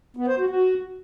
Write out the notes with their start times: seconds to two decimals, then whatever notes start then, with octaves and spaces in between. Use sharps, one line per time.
0.17 B3
0.28 C5
0.39 F#4
0.50 F#4